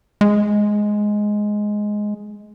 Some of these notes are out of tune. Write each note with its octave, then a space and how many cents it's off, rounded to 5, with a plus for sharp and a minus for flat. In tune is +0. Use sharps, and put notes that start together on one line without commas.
G#3 +5